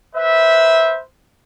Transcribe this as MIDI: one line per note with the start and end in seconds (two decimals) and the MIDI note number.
0.14 0.99 71
0.14 0.99 72
0.14 0.99 76